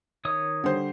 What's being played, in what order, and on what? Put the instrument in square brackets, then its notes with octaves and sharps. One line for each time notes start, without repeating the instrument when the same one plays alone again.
[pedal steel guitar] D#3 C#5 D#6
[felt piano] D3 G3 C5